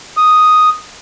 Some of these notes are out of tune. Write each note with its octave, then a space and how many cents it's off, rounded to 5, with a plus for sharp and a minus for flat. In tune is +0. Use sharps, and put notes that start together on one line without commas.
D#6 +0